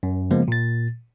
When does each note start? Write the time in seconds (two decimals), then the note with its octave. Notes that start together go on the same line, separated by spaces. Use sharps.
0.03 F#2
0.31 C#3 F3 G#3 A#3 B3
0.48 A#2 A6